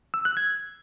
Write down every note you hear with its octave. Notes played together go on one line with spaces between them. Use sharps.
E6
F#6
G#6